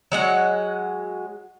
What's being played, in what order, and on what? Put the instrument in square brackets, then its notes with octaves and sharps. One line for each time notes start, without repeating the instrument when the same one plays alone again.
[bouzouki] F#3 G#3 F#5